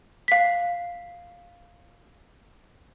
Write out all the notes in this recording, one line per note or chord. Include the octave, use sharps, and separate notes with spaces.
F5 B6